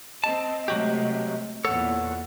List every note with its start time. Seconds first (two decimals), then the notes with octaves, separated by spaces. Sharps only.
0.24 C4 D#5 A5
0.68 C3 F#3 G#3 A3 F#4 G4
1.65 E2 A#2 A4 C#5 F#5